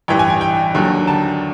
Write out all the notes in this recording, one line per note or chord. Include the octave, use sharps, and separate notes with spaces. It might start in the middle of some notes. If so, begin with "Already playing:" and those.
A1 G2 E3 G5
G#5
G#5
G5
D#2 D3 F#3
A5